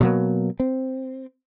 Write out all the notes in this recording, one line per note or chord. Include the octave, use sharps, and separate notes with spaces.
B2 F#3 A#3
C4